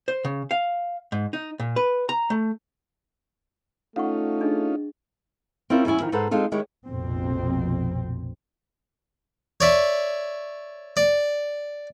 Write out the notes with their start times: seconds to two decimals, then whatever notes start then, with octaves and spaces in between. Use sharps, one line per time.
0.08 C5
0.25 C#3
0.51 F5
1.12 G#2
1.33 D#4
1.60 A#2
1.76 B4
2.09 A#5
2.30 A3
3.96 A3 C#4 D#4 F4 F5 F#5 C#6
4.41 D4 G#4 D#5
5.70 C4 C#4 E4 F4 A#4
5.85 E2 G3 C#4 E4 G#5
6.00 D#3 F3
6.12 G#2 D#4 A4 B4 C5 F#5
6.31 G#3 C4 D#4 F4 A4
6.52 D#3 G#3 E4 G4 C#5
6.87 F1 A#1 F2 B2 C4
9.61 C#5 D5 E5
10.97 D5